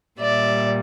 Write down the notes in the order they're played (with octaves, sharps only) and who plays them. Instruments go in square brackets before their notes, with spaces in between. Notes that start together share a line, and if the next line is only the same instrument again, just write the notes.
[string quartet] A#2 G3 D5 E5